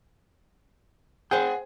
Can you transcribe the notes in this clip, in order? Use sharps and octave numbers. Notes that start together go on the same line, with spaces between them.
G#4 C5 F#5 G5